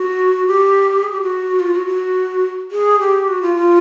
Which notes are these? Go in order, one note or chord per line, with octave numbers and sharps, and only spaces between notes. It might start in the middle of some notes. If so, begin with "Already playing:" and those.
Already playing: F#4
G4
G#4
G4
F#4
F4
F#4
F#4
G#4
G4
F#4
F4
F4